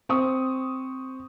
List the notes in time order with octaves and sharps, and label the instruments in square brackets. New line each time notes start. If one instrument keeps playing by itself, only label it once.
[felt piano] C4 C#6 D#6